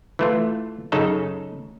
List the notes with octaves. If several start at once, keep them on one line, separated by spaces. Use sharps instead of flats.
E3 A3 F4
F#2 C#3 D#4 A4